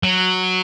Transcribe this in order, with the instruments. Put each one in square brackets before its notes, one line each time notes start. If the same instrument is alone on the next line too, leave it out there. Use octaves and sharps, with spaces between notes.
[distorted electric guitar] F#3